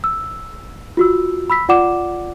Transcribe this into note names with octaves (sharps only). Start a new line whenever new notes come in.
E6
F4 F#4 E6
B5 E6 B6
F4 D5 F#5 D6 E7